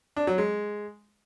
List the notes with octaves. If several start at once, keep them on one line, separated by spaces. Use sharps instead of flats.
D4
F#3
G#3